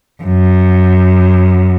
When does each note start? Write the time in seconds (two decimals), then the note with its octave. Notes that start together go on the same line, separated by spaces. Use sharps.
0.23 F#2